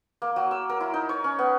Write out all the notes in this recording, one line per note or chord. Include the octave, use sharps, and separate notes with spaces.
A#3
F#3
E6
A#4
E4
D#4
C#5
C#4
B3